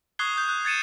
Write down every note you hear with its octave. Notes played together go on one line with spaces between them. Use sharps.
C#6 D#6 F#6 G#6 C7 G7
D#6 G6
F#6
G#6 A6 C#7 D#7 E7